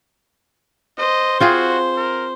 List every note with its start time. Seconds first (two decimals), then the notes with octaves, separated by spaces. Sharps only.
0.98 C5 D#5
1.40 C4 F4 F#4 G#4
1.97 A#4